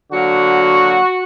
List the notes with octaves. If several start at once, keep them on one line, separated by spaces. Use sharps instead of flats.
D3 F#3 A#3 F#4